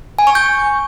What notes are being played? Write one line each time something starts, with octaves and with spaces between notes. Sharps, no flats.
G#5
C#6
G6